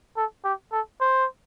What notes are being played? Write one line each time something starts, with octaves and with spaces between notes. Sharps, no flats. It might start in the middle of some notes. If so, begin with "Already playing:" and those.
A4
G4
A4
C5